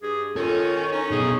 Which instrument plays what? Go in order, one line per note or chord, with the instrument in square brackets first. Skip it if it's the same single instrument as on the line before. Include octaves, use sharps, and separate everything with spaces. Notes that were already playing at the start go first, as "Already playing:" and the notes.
[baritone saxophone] G2 [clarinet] G#4
[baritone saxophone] D#3 [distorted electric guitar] C#4 [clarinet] F4 [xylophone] A4
[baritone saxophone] C#4 [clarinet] D#4
[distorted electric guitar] B2 D#4 [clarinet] G#4